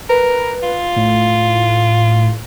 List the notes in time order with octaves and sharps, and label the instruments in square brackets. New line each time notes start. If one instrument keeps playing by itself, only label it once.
[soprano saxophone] A#4 [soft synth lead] B4
[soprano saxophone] F4
[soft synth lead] A2